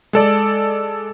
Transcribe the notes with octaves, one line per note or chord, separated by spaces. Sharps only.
G#3 A4 D5